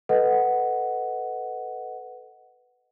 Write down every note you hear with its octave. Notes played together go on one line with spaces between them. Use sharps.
A4 B4 D#5 F#5